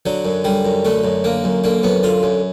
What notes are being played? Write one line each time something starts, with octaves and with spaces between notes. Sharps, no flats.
D3 F#3
F#2
D3 G3
F#2
D3 A3
F#2
D3 A#3
F#2
D3 A#3
F#2 B3
D3 F4
F#2